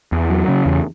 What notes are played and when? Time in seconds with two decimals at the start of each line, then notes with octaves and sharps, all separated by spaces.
0.12 E2
0.30 F#3
0.48 C#3
0.66 E2